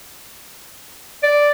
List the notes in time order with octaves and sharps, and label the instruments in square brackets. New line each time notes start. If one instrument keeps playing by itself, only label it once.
[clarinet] D5